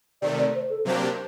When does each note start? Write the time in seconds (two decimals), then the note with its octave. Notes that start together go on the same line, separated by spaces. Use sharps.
0.21 C3 D#3 A3 D5
0.38 D5
0.54 C5
0.69 A4
0.85 C3 F#3 A#3 D4 G4 C5